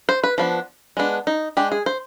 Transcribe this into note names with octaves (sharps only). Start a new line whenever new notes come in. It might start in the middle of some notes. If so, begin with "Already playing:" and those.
C5
B4
F3 B3 D4
G#3 B3 D4
D#4
G#3 D4 G4
G#4
C5